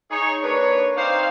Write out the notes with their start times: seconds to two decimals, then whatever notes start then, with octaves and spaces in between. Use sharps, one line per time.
0.11 D#4 G#4 C#5
0.43 A#3 D4 B4 C#5
0.96 C4 D#4 C5 D5 F5